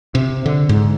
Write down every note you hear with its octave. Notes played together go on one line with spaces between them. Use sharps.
C3
D3
G#2